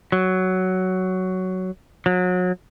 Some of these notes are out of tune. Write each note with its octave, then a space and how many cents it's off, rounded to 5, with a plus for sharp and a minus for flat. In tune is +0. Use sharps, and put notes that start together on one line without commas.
F#3 +10
F#3 -30